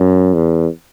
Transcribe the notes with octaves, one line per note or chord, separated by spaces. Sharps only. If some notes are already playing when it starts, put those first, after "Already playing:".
Already playing: F#2
E2